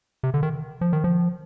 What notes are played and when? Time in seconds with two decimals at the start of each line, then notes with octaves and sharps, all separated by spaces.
0.23 C3
0.34 D3
0.43 D#3
0.81 F3
0.93 D#3
1.04 F3